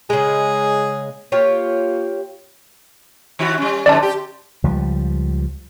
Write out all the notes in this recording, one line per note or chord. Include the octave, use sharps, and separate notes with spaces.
C#3 G#3 G#4
A#3 F4 G4 C#5
D#3 E4 F#4
G3 C#4
F2 G#2 D3 D5 A5
G4
C#2 F3 G3